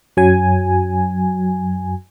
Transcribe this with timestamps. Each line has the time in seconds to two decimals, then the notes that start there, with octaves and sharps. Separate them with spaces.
0.17 F#2 F#3 G#5